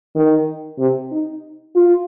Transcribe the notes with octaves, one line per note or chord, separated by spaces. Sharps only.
D#3
C3
D#4
F4